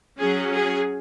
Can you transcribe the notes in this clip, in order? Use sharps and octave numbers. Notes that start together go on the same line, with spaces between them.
F#3 C#4 G#4
G#4